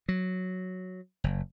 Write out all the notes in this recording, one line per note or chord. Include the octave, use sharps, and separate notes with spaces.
F#3
F#1